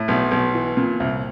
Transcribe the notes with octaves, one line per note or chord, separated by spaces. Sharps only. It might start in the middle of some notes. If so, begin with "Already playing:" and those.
Already playing: A2
B1
B1
E3
A#2
C2